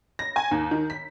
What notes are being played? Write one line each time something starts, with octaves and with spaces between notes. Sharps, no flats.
A#6
G#5
D#2
D#3
B6